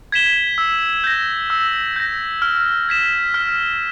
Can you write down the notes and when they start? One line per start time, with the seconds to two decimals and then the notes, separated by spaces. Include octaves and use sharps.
0.12 G#6 B6 E7 G7
0.58 E6
1.04 G6 A#6
1.50 E6
1.96 G6 A#6
2.42 F6
2.89 G#6 B6 E7
3.34 F6